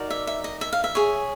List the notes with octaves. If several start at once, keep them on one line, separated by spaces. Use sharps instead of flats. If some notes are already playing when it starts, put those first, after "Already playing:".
Already playing: D#4 F#4 A#4 D5
E5
E5
D#5
E5
F5
E5
G#4 C#5